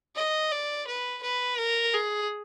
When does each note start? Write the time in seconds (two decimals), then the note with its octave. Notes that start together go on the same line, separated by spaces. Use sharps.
0.16 D#5
0.51 D5
0.87 B4
1.23 B4
1.58 A#4
1.94 G#4